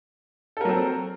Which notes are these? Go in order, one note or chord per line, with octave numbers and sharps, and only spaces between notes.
F#3 C4 A4 A#4